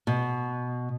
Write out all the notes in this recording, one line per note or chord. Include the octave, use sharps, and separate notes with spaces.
B2